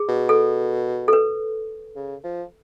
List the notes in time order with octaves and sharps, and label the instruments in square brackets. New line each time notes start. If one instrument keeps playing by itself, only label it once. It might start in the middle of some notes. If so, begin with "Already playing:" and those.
Already playing: [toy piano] G#4
[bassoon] B2
[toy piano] A4
A4
B4
[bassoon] C#3
F3